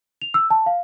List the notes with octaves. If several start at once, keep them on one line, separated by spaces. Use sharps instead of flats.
F7
E6
A5
F5